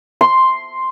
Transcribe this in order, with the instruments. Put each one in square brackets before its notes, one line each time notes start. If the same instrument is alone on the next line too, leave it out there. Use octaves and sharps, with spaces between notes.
[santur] C6